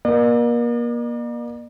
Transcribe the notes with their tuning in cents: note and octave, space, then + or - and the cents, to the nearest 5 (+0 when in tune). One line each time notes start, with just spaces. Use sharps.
A#3 +35 D5 +45